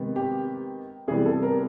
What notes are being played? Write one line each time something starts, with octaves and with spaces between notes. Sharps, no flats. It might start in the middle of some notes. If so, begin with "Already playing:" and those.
Already playing: C3 D#3 G#3 B3
G4
C3 E3 G3 B3 G#4
A4
A#4